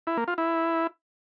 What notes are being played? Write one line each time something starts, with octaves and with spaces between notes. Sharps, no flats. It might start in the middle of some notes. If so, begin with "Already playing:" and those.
E4
A#3
F4
E4